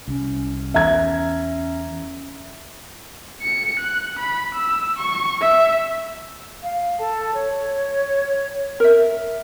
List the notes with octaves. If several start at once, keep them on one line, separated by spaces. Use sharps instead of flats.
C2 C#4
E2 E5 A#5 G#6
C#7
F#6
B5
E6
C#6
E5
F5
A4 A5
C#5
A#4 E5